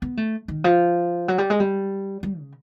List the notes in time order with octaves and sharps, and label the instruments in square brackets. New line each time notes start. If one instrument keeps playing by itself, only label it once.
[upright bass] B3
A3
D#3
F3
F#3
G3
G#3
G3
G3
C#3